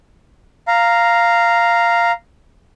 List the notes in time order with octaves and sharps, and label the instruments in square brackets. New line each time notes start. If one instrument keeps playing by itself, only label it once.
[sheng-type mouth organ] F5 A#5